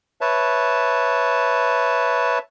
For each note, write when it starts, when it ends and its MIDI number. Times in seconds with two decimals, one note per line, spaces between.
0.21 2.38 71
0.21 2.38 73
0.21 2.38 76
0.21 2.38 81